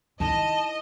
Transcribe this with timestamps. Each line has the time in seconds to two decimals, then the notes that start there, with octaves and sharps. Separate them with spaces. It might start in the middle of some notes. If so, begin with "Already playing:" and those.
0.20 D#3 E4 D#5 A5